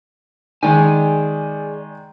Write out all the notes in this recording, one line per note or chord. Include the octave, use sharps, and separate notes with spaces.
D#3 G#3 G#4 D5 G#5